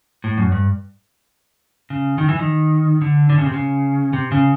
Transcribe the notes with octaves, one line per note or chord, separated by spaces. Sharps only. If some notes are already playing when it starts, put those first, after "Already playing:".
A2
F#2
G2
C#3
D#3
E3
D#3
D3
D3
C#3
C3
C#3
C3
C#3